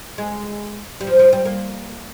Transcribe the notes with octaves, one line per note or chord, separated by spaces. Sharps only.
G#3
G3
F3
F3
G3
A#3